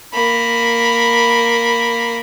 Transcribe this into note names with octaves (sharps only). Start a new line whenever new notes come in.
A#3 B5